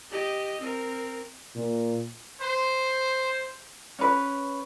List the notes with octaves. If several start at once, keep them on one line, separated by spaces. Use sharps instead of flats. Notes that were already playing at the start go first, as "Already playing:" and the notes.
G4 D#5
C4 A#4
A#2
C5
C#4 B4